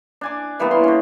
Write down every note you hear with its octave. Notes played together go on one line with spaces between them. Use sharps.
D4 G#5 D6
E3 G3 A#3 B3
A#3 C#5 C6
D3 C#4